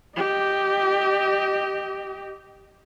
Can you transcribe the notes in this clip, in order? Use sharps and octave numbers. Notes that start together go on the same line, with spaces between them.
G4 D#5